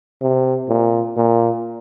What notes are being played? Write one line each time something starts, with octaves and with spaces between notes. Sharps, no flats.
C3
A#2
A#2